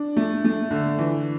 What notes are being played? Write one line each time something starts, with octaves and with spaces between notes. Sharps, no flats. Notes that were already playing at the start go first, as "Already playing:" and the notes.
Already playing: D4
A3
A3
D3
E3